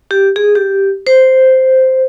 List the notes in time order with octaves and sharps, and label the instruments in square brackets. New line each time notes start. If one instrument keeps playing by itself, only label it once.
[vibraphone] G4
G#4
G4
C5